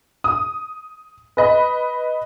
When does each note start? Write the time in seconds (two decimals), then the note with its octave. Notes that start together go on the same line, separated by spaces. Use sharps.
0.24 D#6
1.37 B4 D#5 B5